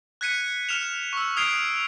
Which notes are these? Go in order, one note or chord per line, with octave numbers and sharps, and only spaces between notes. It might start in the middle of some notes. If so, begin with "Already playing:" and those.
F#6 G#6 B6 C#7 D#7
F6 C#7 E7 F7
C#6 E6
D#6 F6 G#6 C7 D7 F7